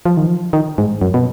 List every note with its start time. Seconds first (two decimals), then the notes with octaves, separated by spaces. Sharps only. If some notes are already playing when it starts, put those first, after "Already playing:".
0.06 F3
0.17 D#3
0.27 F3
0.53 D#3
0.78 G#2
1.02 F#2
1.14 B2